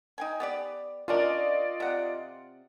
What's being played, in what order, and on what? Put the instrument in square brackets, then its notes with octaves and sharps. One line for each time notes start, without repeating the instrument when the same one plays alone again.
[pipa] D#4 G5 G#5
B3 G4 D5
[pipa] C#4 D4 A#4 [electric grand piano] F4 D5 D#5
[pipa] C3 F#5